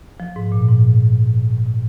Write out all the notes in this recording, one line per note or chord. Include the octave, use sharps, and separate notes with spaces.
F3
G#2
A#2
G#2